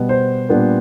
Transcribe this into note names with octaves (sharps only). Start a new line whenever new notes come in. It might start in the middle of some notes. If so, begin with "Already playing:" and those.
Already playing: B2 G3 B3
C5
A#2 G3 B3 D4